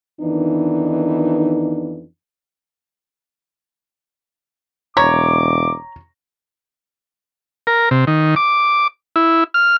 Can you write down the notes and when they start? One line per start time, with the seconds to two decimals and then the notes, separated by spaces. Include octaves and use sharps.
0.21 F2 D#3 E3 B3 D4 D#4
4.97 E1 C#5 A#5 D6
7.67 A#4
7.91 C3
8.07 D#3
8.36 D6
9.16 E4
9.54 F6